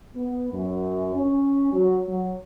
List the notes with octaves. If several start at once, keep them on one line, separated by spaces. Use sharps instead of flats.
B3
F#2
C#4
F#3
F#3